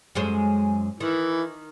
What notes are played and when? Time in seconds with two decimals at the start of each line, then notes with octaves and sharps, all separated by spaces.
0.15 F#2 G#3 C5
1.00 D#3 E3